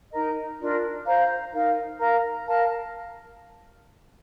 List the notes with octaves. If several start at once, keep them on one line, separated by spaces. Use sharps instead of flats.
D#4 A#4 D#5 A#5
D4 F4 A#4 D5
C5 F5 A#5
D#4 A#4 F5
A#4 F5 A#5
A#4 F5 A5